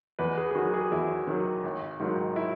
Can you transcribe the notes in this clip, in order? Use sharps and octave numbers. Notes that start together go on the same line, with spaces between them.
E2 B4
G#4
G#4
D#3 F#3 F#4
G#4
E2 E4
D#3 F#3
G#1
G#2 D#3 F#3
E4